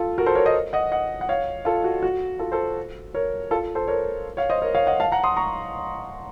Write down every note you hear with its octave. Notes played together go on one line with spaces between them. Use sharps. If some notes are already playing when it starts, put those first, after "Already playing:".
Already playing: F4 A4
F#4 A#4
A4 C5
A#4 C#5
C5 D#5
D#5 F#5
D#5 F#5
F#5
C#5 F5
F4 A4
F#4
F#4
F4 A4
A4 C5
A#4 C#5
F4 A4
A4 C5
A#4 C#5
C#5 F5
C5 D#5
A#4 C#5
C#5 F5
D#5 F#5
F5 A5
F#5 A#5
C6 D#6
A#5 C#6